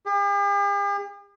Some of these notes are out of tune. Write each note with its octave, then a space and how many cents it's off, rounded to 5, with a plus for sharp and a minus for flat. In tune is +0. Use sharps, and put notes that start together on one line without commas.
G4 +45